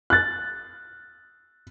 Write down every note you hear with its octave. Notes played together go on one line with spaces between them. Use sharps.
F#6 A6